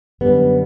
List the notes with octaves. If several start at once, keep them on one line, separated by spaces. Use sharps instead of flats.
F#2 D3 G3 B3